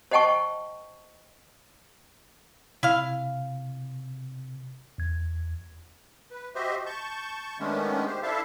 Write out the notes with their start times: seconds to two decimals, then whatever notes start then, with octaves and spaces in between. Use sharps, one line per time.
0.11 C5 D#5 F#5 G5 A5 C#6
2.83 C3 E4 F5
4.98 E2 G#6
6.31 B4
6.55 F#4 G4 C5 D#5 E5
6.86 A5 C#6 G6
7.60 D#3 G#3 A3 B3 C#4 D4
8.07 G4 C5
8.23 D4 E4 A4 E5 F5 A5